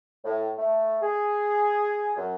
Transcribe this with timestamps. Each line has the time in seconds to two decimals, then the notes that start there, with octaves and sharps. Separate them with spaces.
0.24 A2
0.57 A3
1.01 G#4
2.16 F#2